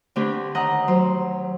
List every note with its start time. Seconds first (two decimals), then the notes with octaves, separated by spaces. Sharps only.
0.16 D3 A3 C4 D4 G4 B4
0.55 D#2 D#5 F#5 A#5
0.88 F#3 C5